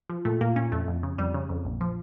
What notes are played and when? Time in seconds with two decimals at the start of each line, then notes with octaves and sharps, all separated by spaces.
0.10 F3
0.25 A#2 A3
0.41 A#2 A#3
0.56 A#2 C#4
0.72 F2 A3
0.88 F2
1.03 C#3
1.18 F2 G3
1.34 C#3
1.49 F2
1.65 A#1
1.81 F3